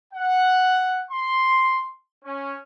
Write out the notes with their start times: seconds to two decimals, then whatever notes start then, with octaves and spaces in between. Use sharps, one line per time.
0.14 F#5
1.11 C6
2.24 C#4